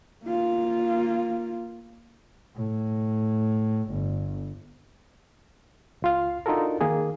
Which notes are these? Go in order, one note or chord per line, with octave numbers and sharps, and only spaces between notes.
A#3 F4
A2
G1
C#2 F4 F5
D4 D#4 F4 F#4 A4 A#4
D#3 A#3 G#4